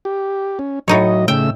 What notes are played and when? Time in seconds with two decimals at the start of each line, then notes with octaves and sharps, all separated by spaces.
0.05 G4
0.59 C#4
0.88 A2 F#3 D#4 C#5 D#5
1.28 C#3 A3 G5 E6